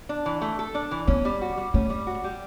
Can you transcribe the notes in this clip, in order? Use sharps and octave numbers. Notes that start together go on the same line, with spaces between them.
D4
E3
A3
A4
D4
E3
B3 C#4
G3
F#4
G3
A3 C#4
G3
F#4
G3